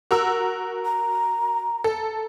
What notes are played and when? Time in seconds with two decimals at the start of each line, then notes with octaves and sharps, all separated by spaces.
0.11 F#4 A#4 E6
0.85 A#5
1.84 A4